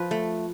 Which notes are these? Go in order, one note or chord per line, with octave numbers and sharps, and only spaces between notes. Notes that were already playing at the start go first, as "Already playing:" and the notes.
Already playing: F3 B4
A3